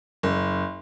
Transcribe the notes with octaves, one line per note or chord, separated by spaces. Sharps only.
F#1